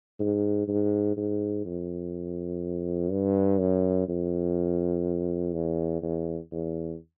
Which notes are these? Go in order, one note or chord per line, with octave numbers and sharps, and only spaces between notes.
G#2
G#2
G#2
F2
G2
F#2
F2
E2
E2
E2